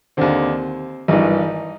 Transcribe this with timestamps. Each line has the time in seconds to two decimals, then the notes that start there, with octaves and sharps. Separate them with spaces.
0.17 D#2 D3 C4
1.08 G#1 G2 E3 D#4